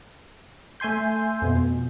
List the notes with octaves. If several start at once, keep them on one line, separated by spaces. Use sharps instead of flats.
A3 E5 G#5 C6 G6
F2 B2